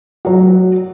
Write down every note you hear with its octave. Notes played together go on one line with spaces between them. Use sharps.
F#3 F#4